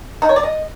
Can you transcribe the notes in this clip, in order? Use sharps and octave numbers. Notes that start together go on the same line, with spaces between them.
D#4
C#5
D5
D#5